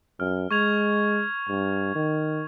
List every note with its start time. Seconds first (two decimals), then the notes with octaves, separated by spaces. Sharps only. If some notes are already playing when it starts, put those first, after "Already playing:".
0.20 F#2 F6
0.51 G#3 C#6 G#6 F7
1.49 G2
1.95 D#3